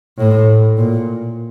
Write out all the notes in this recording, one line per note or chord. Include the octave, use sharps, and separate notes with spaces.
A2
A#2